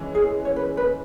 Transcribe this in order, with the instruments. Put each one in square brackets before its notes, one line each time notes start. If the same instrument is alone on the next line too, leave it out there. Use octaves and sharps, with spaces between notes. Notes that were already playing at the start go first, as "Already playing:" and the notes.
Already playing: [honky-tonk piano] E3 G#3 C#4
[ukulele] G#4
C#5
B4
B4